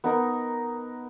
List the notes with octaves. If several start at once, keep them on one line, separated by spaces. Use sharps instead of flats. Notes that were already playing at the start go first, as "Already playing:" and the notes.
B3 D#4 A#4